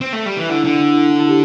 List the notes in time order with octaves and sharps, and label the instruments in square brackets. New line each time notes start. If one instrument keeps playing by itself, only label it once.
[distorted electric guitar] C4
A3
G3
E3
[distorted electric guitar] D3 [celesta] E4
[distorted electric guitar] D3 [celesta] D4
[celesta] D4
E4
D4
E4
G4